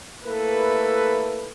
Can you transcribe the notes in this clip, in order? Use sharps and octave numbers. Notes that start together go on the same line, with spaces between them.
A3 A#3 E4 A4 B4